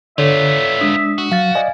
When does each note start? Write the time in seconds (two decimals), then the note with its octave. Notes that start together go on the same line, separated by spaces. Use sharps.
0.18 D3 B3 F4 A4 C#5 D5 E5
0.81 G#3 D4 D#6
1.18 F#4
1.32 F#3 F5 A6
1.55 D5 D#5 G#5